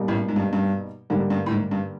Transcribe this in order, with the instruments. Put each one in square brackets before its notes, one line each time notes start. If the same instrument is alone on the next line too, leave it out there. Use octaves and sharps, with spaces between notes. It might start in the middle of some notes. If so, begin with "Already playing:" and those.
Already playing: [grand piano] B2 G3 A#3 D#4
[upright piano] A1 A2
G#2
G2
G2
[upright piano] G#2 [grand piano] D3 G3 A#3 D4
[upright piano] G2
A2
G#2
G2